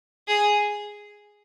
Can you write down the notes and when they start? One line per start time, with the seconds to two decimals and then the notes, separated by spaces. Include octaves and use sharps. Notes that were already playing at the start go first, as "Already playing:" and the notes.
0.28 G#4